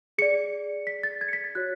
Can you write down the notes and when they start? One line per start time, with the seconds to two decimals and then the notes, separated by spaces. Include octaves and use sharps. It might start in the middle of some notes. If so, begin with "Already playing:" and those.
0.18 G#4 D5 C#7
0.87 B6
1.03 A6
1.21 G#6
1.28 C#7
1.33 B6
1.44 A6
1.55 F#4 C#5 F#6